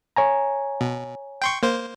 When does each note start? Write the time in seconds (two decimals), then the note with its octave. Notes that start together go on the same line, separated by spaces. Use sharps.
0.16 C#5 G#5 A#5
0.81 B2
1.42 G5 C6 C#6
1.63 A#3 C5